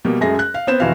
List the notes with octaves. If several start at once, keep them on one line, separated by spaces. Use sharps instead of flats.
B2 G3 A#3
F#2 G#3 A3 G#4 A#6
F#6
F5
B3 C4 C5 E7
F1 E3 F#4 F5